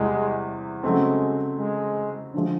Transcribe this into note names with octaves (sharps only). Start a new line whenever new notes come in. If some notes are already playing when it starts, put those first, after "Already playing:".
Already playing: E2 C3 E3 G3 G#3
C#3 F#3 G#3 A3 C4
G#3
D3 F3 G#3